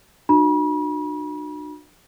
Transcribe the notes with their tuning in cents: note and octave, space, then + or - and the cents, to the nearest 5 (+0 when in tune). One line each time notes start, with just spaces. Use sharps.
D4 +35 F#4 -30 B5 -40